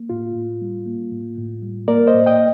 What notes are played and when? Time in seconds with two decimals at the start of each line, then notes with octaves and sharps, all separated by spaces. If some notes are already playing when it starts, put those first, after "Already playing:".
Already playing: A#3
0.09 A2 F4
0.35 A2
0.62 G3
0.86 A#3
1.12 A2
1.38 A2
1.62 G3
1.88 A#3 A#4 D5
2.07 C5 D#5
2.14 A2
2.26 D#5 G5